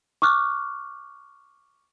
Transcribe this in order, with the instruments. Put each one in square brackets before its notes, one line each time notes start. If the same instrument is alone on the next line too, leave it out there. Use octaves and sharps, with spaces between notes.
[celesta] C#6 D6 F6 F#6